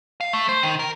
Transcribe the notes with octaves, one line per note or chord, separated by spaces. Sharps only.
F5
A3
C5
D#3
A#4